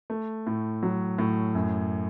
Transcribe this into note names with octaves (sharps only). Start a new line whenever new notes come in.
A3
A2
F#3
A2
F#2